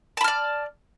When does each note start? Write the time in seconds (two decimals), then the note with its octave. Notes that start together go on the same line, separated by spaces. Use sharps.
0.17 A5
0.21 B5
0.24 F6
0.28 D5